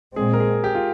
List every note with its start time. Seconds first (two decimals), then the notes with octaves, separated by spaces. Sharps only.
0.16 A#2 G#3 C4 G#4
0.33 A#4
0.40 G#4
0.64 G4
0.75 F4